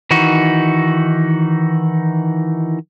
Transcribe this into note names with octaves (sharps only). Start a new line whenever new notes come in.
D#3 E3 D#4 F#4